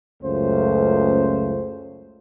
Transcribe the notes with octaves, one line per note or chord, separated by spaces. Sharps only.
C#2 F#2 A3 C#4 F4 C5